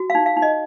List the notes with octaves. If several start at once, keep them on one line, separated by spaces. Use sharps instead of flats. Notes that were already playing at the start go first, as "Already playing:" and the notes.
Already playing: F#4
F5
D#4
F5
D#4
D#5